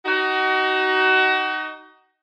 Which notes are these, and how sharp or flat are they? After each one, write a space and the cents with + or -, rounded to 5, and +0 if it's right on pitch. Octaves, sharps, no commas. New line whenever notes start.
D#4 +0 F#4 +30